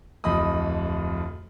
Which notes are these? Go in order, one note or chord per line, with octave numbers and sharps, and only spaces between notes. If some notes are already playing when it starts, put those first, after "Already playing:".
D1 F2 D#5 B5 D#6